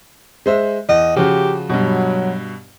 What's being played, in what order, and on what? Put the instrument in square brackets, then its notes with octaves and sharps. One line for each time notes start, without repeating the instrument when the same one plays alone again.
[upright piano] G#3 C5 E5
[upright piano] E2 [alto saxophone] D#5
[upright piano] C#3 F3 F#4 [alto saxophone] G4
[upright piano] G2 B2 [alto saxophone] F#3